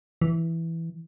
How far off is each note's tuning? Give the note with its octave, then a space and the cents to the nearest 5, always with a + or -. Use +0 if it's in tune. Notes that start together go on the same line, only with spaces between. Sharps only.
E3 +0